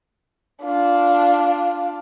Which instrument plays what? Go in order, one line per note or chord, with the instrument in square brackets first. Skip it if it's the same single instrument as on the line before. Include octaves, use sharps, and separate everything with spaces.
[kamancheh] D4 F4